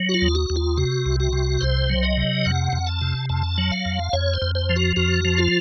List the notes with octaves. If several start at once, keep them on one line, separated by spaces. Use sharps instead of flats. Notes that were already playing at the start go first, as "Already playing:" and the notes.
Already playing: F#3
F#4
F4
D#2
F#4
D#2
F4
C3 F#4
C2
F#4
C3
C2 C5
F#3
D#5
C3
F2 F#5
F2
A5
C3
F2 A5
F#3
F5
F2
F2 C#5
C5
F2
C5
F3
F#4
F2 F#4
F3
F4